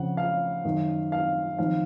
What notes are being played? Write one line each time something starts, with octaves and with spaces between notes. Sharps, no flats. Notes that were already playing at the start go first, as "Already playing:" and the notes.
Already playing: F2 C#3 F#5
F5
F#2 D#3
F5
F2 D#3 F5